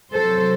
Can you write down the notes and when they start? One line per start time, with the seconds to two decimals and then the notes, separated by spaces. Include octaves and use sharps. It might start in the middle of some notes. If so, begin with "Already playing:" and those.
0.12 C3 F#3 A4 C5